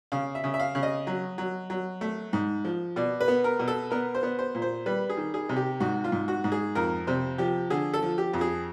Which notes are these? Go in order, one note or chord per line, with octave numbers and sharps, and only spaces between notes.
C#3 F5
E5
C#3
E5
F5
C#3
D#5
F#3
F#3
F#3
A3
G#2
F3
B2 D5
B4
B3
A#4
B2
A4
B3 A#4
C5
B3
C5
A#2
C5
G3 B4
G#4
D#3
G#4
C3
G4
G#2 F#4
F4
G#2
F#4
G#2
G#4
F2 A#4
C3 C5
F3 G4
D3 G#4
A4
F3
G4
F2
G#4